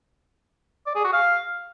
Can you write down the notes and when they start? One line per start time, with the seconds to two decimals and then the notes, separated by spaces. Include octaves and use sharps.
0.86 D5
0.95 G#4
1.04 F#4
1.13 F5